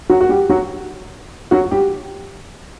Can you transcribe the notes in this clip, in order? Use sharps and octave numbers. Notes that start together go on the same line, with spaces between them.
F#3 F#4
F#4
G3 G4
F#3 F#4
F#3 F#4
G3 G4